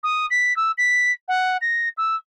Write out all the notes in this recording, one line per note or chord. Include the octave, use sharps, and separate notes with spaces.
D#6
B6
E6
B6
F#5
A#6
E6